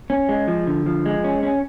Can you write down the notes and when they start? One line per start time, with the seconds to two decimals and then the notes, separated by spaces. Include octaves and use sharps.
0.10 C#4
0.29 G#3
0.48 F3
0.67 D3
0.86 F3
1.06 G#3
1.24 C#4
1.43 C#4